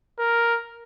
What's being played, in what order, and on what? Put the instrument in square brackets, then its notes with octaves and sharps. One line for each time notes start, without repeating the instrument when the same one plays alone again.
[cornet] A#4